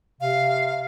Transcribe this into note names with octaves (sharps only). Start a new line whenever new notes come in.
C3 F5